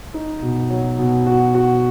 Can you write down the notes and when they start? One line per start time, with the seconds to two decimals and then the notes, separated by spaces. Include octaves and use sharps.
0.14 D#4
0.42 B2
0.70 F#3
0.99 B2
1.26 F#4
1.54 F#4